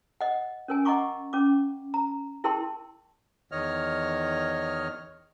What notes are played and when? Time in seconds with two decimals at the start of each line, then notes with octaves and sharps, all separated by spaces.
0.21 D#5 F#5
0.68 C#4 A#4 G#5
0.85 D#5 F#5 A#5 C#6 D6
1.33 C#4 D6
1.94 A#5
2.44 E4 G#4 A#4 G5 A5 C6
3.52 E2 D#3 C#5 D#5 F6